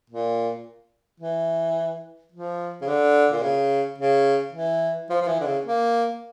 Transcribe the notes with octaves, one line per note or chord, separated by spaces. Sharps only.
A#2
E3
F3
C#3
D3
A#2
C#3
C#3
E3
F3
F3
E3
D3
C#3
A#3